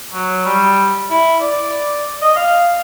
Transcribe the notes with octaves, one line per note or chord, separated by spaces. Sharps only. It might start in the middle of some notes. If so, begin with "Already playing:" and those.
F#3
G3
E4
D5
D#5
F5